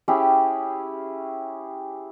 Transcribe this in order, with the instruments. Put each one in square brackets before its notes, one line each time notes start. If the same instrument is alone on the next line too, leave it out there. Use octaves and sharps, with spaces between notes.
[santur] C#4 E4 G4 G#4